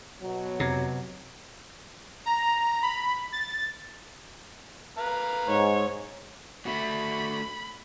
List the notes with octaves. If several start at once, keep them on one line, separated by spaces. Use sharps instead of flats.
B2 F#3
F2 C3 A#5 G#6
A#5
B5
A6
B4 F5 A#5
G#2 C#5
A3 F#4 B5